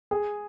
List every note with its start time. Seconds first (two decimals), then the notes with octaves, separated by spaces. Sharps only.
0.11 G#4